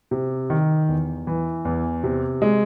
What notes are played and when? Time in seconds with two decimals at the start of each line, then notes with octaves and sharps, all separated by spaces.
0.11 C3
0.50 D#3
0.89 E2
1.27 E3
1.65 E2
2.03 C3
2.42 G#3